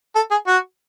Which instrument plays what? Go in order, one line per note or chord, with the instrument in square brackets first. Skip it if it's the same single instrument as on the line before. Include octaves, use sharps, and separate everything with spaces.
[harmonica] A4
G#4
F#4